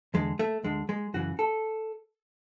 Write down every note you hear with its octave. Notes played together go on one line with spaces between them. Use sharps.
E2 D3 G#3
A3
D2 D3 G#3
G#3
F#2 C#3 E3 F#4
A4